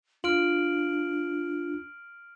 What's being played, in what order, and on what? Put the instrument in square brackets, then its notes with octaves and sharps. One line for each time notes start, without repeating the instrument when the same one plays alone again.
[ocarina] D4 [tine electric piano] F4 [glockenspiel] F6 D7 F#7